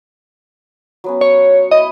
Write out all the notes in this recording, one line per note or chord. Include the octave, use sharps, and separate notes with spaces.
F#3 B3 C#4
C#5
E4 D#5